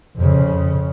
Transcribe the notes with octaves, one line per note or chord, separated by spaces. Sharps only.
F2 C#3